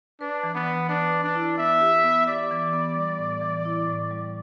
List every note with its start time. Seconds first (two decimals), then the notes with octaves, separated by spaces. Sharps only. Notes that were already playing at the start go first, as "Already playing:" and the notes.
0.21 D4 B4
0.43 E3
0.55 B3
0.67 E3
0.89 D4 B4
1.12 B4
1.24 D4
1.35 E4
1.58 B3 E5
1.81 G4
2.04 B3
2.27 G4 D5
2.51 E3
2.73 B3
2.96 G3
3.19 A2
3.41 E3
3.65 E4
3.87 A2
4.11 G3